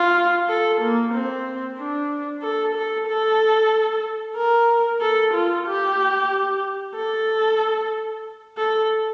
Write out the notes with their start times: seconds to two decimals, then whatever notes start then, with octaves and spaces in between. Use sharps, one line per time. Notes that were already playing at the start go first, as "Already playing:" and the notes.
Already playing: F4
0.48 A4
0.82 A#3
1.14 C4
1.79 D4
2.43 A4
2.75 A4
3.07 A4
4.36 A#4
5.01 A4
5.34 F4
5.67 G4
6.95 A4
8.57 A4